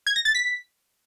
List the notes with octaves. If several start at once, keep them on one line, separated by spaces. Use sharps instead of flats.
G#6
A#6
A6
B6